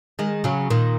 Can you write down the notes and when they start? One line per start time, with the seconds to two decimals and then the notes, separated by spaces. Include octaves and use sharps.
0.19 D#3 G#3
0.44 C#3 F#3
0.70 A#2 D#3